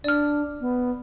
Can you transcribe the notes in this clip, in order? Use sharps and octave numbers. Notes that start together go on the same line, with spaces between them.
D4 D5 F6
B3